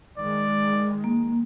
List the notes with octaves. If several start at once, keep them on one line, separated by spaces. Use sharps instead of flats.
D#3 G#3 D5
A#3